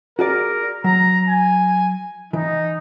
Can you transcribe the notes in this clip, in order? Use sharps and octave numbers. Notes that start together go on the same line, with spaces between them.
F#4 G#4 A#4 D5
F#3 A#5
G#5
E3 D#4